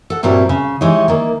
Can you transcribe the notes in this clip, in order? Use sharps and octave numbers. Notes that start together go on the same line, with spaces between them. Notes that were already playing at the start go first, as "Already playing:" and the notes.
A4 F#5
G2 A#2 F#3 G3 C4 E4
C#3
E3 G#3 D#4 G4 C#5
D#3 E3 A#3